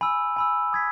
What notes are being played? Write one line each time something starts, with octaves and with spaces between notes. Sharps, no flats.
G#5 B5 E6
G#5 B5 E6
D#6 G#6 B6